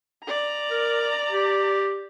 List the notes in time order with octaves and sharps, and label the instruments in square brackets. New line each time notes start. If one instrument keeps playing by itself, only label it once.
[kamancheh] D5 A#5
[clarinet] A#4
G4